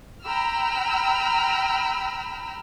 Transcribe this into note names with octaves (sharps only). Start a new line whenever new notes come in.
G5 A#5 B5 E6 F6